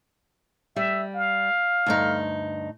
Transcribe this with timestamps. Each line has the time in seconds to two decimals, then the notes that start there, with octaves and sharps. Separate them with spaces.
0.76 G3 E5
1.15 F5
1.86 D2 G2 D#4